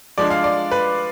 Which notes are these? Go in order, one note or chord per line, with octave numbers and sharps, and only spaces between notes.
F3 G#3 D4 D5
F5
D5
B4